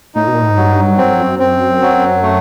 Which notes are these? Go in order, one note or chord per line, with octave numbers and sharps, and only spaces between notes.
A2 D#4
B2
A#2
A2
G#2
G2 F#3
F#2 C4
F2
F#2
C4
F#3
A3